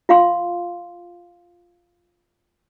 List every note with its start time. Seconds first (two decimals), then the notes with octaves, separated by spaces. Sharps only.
0.09 F4 F5 C6